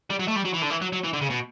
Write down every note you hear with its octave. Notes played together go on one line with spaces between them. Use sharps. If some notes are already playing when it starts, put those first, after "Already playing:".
G3
F#3
A3
G3
F#3
E3
D3
E3
F#3
F#3
E3
D3
C#3
B2